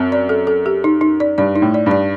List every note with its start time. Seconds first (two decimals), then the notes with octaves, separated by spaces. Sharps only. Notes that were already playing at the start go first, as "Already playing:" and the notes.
Already playing: F#2 C4
0.12 D5
0.29 A4
0.47 A4
0.66 G4
0.84 D#4
1.01 D#4
1.20 D5
1.38 G2 D5
1.55 D#4
1.62 A2
1.74 D5
1.86 G2 D5